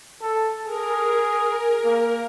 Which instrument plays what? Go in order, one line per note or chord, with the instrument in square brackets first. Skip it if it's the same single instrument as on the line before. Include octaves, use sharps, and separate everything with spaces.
[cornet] A4
[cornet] G#4 [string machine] A#4
[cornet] A#3